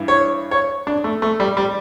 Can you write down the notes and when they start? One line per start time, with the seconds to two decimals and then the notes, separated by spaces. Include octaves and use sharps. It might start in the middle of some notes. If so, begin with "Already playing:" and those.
Already playing: G2 E3
0.08 C#5
0.51 C#5
0.87 D4
1.04 A3
1.22 A3
1.40 G3
1.57 G3